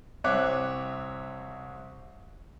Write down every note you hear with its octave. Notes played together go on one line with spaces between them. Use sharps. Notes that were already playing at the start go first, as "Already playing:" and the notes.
C2 C4 C#5 E5 D6 F#6